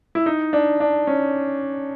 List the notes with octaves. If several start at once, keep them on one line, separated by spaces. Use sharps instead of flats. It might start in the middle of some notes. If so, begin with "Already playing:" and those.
E4
D#4
D4
D4
C#4